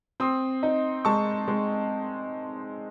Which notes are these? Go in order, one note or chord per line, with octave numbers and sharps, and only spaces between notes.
C4 C6 D#6
D#4
G#3 A5 C#6
G#3